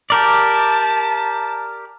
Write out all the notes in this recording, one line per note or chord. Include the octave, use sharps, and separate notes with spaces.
G4 A#4 D5 A5